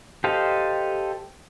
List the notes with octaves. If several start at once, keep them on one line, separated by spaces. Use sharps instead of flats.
G4 A4 C5 D#5 F5